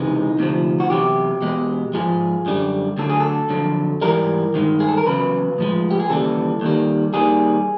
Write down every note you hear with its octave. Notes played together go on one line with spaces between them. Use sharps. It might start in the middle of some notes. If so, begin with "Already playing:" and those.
Already playing: C#2 C3 E3 G#3 D#4
D2 C3 F3
F#4
E2 C3 D#3 F#3 G4
E2 B2 G#3
G#2 F3 G#3 G#4
F#2 D3 G3
D2 D3 F#3 A4
G#4
A4
F2 D3 F#3
G#2 E3 G3 A#4
G2 D#3 G#3
G#4
A4
A#4
E2 C#3 F#3 B4
A2 F3 G#3
G4
G#4
D#2 C#3 E3 G3 A4
D#2 D#3 G3
D#2 D#3 G3 G#4